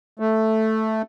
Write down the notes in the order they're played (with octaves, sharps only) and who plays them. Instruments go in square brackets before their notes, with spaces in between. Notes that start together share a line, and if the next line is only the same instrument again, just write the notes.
[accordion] A3